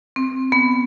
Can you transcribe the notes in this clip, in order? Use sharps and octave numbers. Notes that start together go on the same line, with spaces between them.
C4
B3